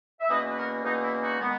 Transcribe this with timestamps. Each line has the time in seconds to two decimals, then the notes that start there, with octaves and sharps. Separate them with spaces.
0.21 E5
0.29 E2 B2 A#3 C#4 B4 D#5
0.48 B4
0.56 F#4 A#4
0.84 E2 B2 A#3 C#4 D#4
1.02 E4
1.21 D#4 F#4
1.39 D#3 G#3 B3